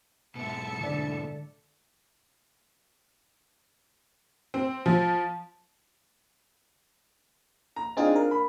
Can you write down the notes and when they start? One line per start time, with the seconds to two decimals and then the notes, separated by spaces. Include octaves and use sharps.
0.35 G#2 B2 E5 A5 C#7
0.81 D3 D5
4.54 C4
4.86 F3
7.76 A#5
7.97 C4 D4 D#4 F4 G#4
8.16 A#4
8.31 B5